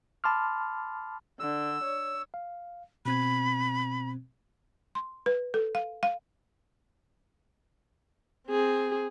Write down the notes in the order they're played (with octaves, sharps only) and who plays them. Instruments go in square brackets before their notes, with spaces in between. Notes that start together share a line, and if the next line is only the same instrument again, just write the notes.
[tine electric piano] A5 B5 C6 D6 F6
[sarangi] D3 [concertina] E6
[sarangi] C#5
[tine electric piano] F5
[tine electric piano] B2 C4 G#6 [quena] B5
[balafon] C6
B4
A4
F5
F5
[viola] C4 G#4